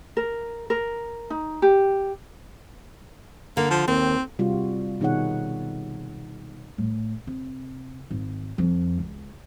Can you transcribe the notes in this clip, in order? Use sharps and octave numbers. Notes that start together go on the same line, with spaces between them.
A#4
A#4
D#4
G4
D3 A#3
F3
D#2 C4
C3 G3 F4 F#4
B2 D#3 D#4 G#4 C#5 F#5
A2
C3
G#1
F2
C#2